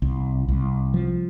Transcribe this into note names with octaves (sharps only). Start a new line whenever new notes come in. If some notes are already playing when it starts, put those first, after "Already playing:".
C2
C2
F3